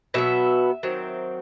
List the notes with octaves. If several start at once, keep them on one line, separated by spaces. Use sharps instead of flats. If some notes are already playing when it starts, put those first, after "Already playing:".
B2 F#3 B3 E5
D#3 F#3 C4